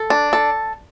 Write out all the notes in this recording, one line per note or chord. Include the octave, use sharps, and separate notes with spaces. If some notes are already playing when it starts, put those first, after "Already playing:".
Already playing: A4
D4
A4